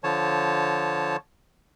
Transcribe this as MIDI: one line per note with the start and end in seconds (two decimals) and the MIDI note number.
0.04 1.17 50
0.04 1.17 53
0.04 1.17 73
0.04 1.17 81